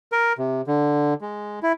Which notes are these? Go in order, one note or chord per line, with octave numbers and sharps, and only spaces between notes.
A#4
C3
D3
G#3
E4